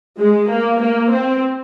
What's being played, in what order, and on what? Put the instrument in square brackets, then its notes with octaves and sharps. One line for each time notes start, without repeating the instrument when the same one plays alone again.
[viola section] G#3
A#3
A#3
C4